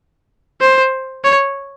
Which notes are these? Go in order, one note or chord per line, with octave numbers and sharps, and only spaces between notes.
C5
C#5